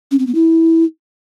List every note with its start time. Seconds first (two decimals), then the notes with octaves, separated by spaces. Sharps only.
0.11 C#4
0.19 C4
0.27 B3
0.35 E4